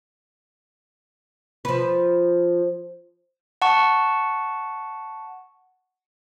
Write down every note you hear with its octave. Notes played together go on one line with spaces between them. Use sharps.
F3 B4
F#5 A5 C#6